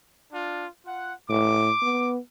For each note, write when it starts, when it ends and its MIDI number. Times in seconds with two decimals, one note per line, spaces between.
0.33 0.65 62
0.33 0.65 65
0.85 1.13 65
0.85 1.13 78
1.29 1.70 45
1.29 2.12 86
1.82 2.18 59